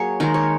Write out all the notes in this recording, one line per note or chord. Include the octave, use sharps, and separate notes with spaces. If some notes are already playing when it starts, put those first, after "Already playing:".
Already playing: F#3 A#3 G#4 C#5
D#3 G#3 A#4
C#5